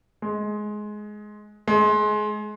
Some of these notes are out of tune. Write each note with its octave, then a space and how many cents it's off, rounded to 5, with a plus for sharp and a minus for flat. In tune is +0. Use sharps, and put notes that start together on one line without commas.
G#3 +15
G#3 +25